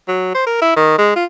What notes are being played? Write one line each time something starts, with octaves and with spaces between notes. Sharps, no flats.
F#3
C5
A#4
E4
D#3
G#3
F4